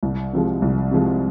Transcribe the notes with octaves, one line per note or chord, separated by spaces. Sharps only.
C2
C3 F3 G#3
C2
C3 F3 G#3